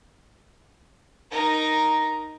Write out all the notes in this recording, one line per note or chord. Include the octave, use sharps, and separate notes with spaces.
D#4 A#4